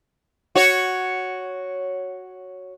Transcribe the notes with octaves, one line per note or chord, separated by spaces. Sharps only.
F#4 C#5